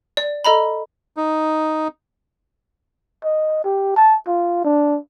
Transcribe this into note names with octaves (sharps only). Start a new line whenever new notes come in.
D5
A4 D#5 A#5 B5
D#4
D#5
G4
A5
F4
D4